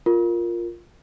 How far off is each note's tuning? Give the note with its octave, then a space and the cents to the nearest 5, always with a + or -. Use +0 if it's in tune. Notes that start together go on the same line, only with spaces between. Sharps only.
F4 +0 A#4 +0